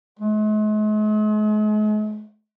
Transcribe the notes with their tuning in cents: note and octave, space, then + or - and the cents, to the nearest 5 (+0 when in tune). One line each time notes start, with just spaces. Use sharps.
G#3 +45